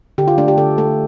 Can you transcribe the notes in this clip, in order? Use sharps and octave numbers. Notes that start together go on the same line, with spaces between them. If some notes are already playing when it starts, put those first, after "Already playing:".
D3 G4
F4
A3 D4
G4
D3 A4
A3